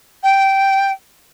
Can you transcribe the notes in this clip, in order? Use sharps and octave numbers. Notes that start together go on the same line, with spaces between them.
G5